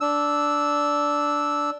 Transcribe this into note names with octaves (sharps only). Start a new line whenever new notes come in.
D4 E6